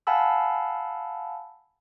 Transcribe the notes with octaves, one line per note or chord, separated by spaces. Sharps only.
F5 F#5 G#5 A5 B5 E6